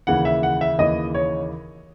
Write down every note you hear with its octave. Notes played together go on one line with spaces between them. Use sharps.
D#2 C#3 E3 F#5
E5
F#5
E5
D#2 C#3 E3 D#5
C#5